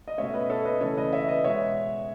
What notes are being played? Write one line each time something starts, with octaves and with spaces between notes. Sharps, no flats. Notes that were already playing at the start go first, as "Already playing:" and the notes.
D#5
B2 A3 C#4 C#5 E5
B4 D#5
A4 C#5
B4 D#5
C#3 E3 A3 C#4 A4 C#5
B4 D#5
C#5 E5
B4 D#5
B2 G#3 B3 C#5 E5